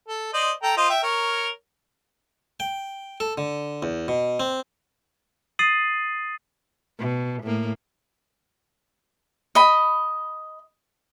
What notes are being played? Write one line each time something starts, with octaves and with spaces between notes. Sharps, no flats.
A4
C5 D5 D#5
A4 G5 A#5
F4 C5 D#5
E5 G5
A#4 C#5
G5
A4
D3
E2
B2
C4
D#6 A6 C7 D#7 F#7
B2
A2 A#3
D#5 B5